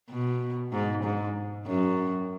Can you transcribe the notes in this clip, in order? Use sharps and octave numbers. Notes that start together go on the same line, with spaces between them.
B2
G#2
G#2
F#2